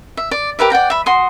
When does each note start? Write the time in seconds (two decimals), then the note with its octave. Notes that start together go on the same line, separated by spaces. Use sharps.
0.17 E5
0.31 D5
0.59 G4 A#4 B4 E5
0.70 D5 F#5 G5 A#5
0.90 E5 B5
1.06 F#4 C6 D#6